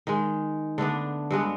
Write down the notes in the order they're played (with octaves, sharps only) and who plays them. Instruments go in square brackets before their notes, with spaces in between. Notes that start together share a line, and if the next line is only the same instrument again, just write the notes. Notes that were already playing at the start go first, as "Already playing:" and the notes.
[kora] D#3 G#3
D3 A3 B3 D4
G2 G#3 B3 F#4